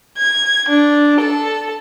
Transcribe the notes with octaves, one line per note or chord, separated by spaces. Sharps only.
G#6
D4
A4